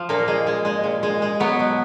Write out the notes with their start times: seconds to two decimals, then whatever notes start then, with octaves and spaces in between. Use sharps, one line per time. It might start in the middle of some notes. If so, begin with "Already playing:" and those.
Already playing: F3
0.09 A#2 A#3
0.28 G#3
0.47 G#3
0.65 G#3
0.84 A#2
1.03 G#3
1.22 G#3
1.40 F#3 B3
1.59 B2